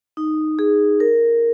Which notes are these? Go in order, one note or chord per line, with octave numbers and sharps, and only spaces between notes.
D#4
G#4
A#4